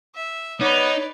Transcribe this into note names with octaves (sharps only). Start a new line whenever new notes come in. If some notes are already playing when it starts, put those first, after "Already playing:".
E5
B3 D#4 B4 C#5 D5